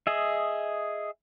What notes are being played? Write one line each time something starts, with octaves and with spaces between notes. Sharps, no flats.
G#4 D#5 E5